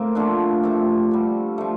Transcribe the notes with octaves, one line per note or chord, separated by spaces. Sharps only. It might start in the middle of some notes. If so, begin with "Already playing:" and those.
Already playing: A2 A#3 C4
D3 F3 A3 D4 F4
C3 F3 A3
D3 G3
F3 A3